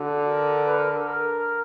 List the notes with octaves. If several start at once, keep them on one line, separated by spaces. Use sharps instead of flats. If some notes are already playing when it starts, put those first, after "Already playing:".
Already playing: D3 F#4
A#4
B4
A#4
A4
A#4